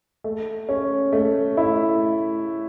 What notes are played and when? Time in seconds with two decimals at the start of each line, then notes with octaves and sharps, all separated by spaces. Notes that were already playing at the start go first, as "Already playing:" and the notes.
0.24 A3
0.69 C#4
1.13 A3
1.57 E4